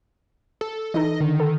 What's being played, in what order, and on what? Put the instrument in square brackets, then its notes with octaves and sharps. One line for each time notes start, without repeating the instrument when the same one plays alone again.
[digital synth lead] A4
[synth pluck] E3 D#4 A4 [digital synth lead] D#5
[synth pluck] D3 [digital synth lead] D#3
[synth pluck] A4